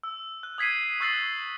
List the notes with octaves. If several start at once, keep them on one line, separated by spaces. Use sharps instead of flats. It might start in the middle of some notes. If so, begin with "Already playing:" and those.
E6
F#6
D#6 G#6 B6 C7 D#7
C#6 E6 F#6 A6 C7 F#7